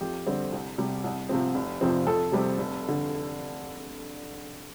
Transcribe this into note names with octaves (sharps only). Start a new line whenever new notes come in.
F2 G4
D3 G3 C4
C2
C3 G3
C2
C3 F3 C4
F1
F2 C3 F3 C4
F2 A4
C3 G3 C4
F1
D3